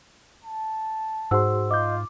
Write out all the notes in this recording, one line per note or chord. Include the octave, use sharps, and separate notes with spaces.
A5
G#2 F#4 G#4 C5 F#5 C6 E6
F4 D#5 D6 G6